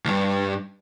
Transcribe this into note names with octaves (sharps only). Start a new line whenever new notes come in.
D2 G2